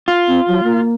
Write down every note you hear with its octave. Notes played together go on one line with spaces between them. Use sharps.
F4
C4
F#3
A#3